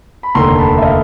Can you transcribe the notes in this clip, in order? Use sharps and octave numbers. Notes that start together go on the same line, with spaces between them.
B5
F1 D#2 D3 A#5 C6
A5 B5
E5
D#5 F5